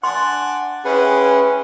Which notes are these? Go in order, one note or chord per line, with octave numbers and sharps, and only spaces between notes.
D4 F#5 G#5 C6
G#3 C#4 E4 G4 G#4 B4 F#5